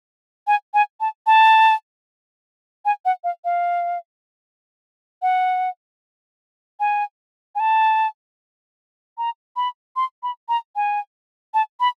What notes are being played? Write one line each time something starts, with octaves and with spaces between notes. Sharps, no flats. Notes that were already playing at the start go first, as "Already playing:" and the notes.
G#5
G#5
A5
A5
G#5
F#5
F5
F5
F#5
G#5
G#5
A5
A#5
B5
C6
B5
A#5
G#5
A5
B5